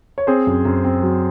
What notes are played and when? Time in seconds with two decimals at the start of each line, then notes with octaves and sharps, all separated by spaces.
0.18 C#5
0.27 C4 G#4 C5
0.47 F#2
0.65 F#2
0.84 C4
1.03 F#3